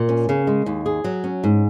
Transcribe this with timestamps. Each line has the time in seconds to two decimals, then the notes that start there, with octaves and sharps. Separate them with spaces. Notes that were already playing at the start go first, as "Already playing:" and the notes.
Already playing: A#2
0.09 C#4
0.29 C#3
0.47 G#3
0.66 D#2
0.86 G#4
1.04 F#3
1.24 C#4
1.44 G#2